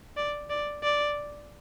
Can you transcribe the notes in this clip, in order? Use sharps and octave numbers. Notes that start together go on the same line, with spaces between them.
D5
D5
D5